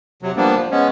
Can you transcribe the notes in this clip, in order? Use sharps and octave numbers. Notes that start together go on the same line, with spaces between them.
C3 F#3
F3 G3 A#3 B3 D4
F3
G#3 B3 C#4